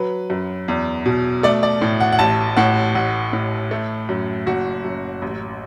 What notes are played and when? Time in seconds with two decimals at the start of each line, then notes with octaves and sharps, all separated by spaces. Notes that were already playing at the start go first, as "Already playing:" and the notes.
Already playing: F#3 B4
0.30 F#2
0.68 E2
1.06 B2
1.43 A3 D5
1.63 D5
1.81 A2
2.00 F#5
2.12 F#5
2.19 A1 A5
2.57 A2 F#5
2.95 A1 F#5
3.33 A2
3.71 A3
4.09 F#2
4.47 F#1 F#4
4.84 F#2
5.22 A1